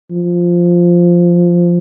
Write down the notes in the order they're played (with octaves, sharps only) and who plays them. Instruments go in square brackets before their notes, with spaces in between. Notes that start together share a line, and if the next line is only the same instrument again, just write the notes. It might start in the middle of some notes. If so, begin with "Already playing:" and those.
[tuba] F3